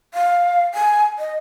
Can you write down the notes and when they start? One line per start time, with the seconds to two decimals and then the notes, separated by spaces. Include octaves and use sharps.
0.14 F5
0.74 G#5
1.19 D#5